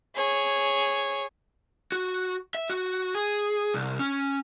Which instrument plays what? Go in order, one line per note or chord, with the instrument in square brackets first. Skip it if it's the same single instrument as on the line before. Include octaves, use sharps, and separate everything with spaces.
[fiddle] G#4 C#5
[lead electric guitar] F#4
E5
F#4
G#4
C2
C#4